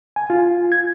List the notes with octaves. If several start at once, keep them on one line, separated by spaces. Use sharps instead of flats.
G#5
F4
G#6